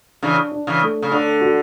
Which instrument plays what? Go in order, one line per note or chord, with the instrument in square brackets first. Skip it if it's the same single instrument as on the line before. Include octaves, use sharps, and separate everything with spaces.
[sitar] C#3 E3 [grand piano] D4
[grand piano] D4
[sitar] C#3 E3
[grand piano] A3
[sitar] C#3
[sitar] D3 [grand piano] D4
[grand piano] F#4